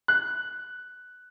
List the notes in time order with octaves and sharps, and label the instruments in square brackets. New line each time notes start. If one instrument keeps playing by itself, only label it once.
[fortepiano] F#6